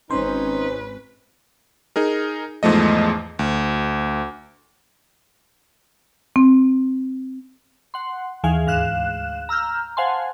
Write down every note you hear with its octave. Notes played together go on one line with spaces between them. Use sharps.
G#1 C#4 D#4 B4 C5
D#4 G#4 A#4
E2 G#2 F3 A3 D#5
D2
C4
F#5 C6
D#2 E3 G#4 F5 G#5
D2 G#2 F5 F#6 E7
A#5 E6 F6 G6
C5 F5 F#5 G#5 A5 C6